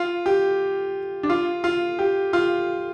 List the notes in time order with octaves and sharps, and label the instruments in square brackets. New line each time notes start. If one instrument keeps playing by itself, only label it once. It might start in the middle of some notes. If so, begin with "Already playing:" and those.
Already playing: [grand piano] F4
G4
D4
F4
F4
G4
F4